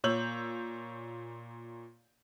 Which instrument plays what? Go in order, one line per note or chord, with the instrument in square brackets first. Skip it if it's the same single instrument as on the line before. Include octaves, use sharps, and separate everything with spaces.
[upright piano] A#2 C#5 E6 G6 F#7